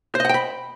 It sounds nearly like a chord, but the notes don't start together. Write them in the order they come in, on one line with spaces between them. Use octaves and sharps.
C5 D#5 F#5 G5 B5